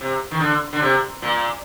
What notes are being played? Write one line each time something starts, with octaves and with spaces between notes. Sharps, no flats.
C3
D#3
D3
D3
C3
A#2